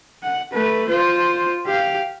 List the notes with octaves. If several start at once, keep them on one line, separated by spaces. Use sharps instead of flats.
F#5
A3 B4
F4 C5
G4 F5